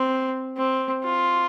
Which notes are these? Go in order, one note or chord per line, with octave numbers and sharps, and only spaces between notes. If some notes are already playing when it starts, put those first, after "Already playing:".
Already playing: C4
C4
F4